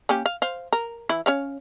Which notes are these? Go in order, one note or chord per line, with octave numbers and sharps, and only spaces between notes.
A#3 C#4 G4
F5
C5 F5
A#4
E3 E4
C#4 C#5 F5